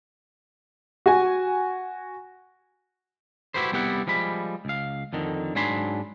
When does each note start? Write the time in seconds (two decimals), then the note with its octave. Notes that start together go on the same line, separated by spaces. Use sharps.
1.06 F#4 G#5
3.54 E4 F#4 G4 B4 C5
3.72 C2 G3 B3 E4 G4 F#5
4.07 F3 G3 G#3 B5
4.65 C#2 F5
5.13 F2 D3 D#3
5.55 G#2 F#3 D4 G#5 B5 C6